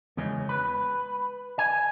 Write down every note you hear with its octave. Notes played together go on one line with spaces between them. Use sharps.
E2 C#3 G#3 C#4
B4
G#5